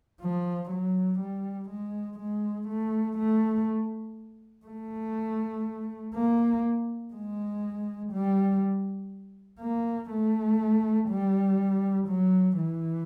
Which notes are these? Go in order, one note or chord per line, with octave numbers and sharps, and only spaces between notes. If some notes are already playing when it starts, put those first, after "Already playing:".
F3
F#3
G3
G#3
G#3
A3
A3
A3
A#3
G#3
G3
A#3
A3
G3
F#3
E3